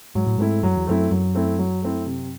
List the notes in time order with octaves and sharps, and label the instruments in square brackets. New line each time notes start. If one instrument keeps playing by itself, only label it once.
[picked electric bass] G#2 [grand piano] F#3
[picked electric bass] A2
[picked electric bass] G#2 [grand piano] A3 C4 E4
[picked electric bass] F#2 [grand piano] F#3
[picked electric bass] E2
[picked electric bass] F#2 [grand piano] A3 C4 E4
[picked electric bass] F#2 [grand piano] F#3
[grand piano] A3 C4 E4
F#3
A3 C4 E4
C3